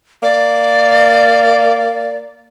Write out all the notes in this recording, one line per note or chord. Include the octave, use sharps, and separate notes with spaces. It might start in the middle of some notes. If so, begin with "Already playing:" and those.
A#3 D5